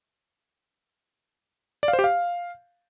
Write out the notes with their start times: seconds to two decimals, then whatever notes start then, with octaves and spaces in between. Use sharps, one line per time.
1.83 D5
1.88 F5
1.93 C5
1.99 G4
2.04 F5